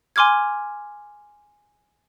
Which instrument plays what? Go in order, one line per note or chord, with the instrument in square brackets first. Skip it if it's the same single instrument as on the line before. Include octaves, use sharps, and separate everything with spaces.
[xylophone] G#5 C6 D6 F6 G#6